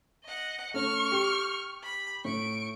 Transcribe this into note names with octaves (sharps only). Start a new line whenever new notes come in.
D#5 F#5
A3 C#4 C#6 F6
G4
B5
A2 C#6 D7